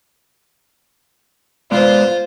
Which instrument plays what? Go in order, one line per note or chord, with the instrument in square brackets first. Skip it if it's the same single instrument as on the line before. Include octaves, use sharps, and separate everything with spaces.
[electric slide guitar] G#3 B3 D5 [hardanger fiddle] F4 C5